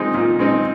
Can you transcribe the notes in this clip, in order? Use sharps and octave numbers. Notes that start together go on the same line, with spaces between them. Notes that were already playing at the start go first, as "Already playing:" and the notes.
Already playing: A#2 G#3 C4 D#4
A#2
G#3 C4 D#4